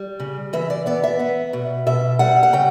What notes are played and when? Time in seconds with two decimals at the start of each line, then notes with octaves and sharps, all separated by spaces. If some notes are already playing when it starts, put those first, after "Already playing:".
Already playing: G3
0.20 C#3
0.53 E3 E5
0.70 D5
0.86 B3 D5
1.04 E5
1.19 B3
1.53 B2
1.86 B2 E5
2.19 G3 F#5
2.43 F#5
2.53 C#3 G5